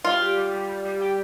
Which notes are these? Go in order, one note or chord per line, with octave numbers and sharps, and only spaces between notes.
G3 F4
G4
G3
G3
G3
G3
G4